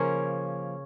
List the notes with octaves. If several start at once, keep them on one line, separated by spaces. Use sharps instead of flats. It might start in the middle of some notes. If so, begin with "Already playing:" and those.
Already playing: C#3 F3 A#3 C#4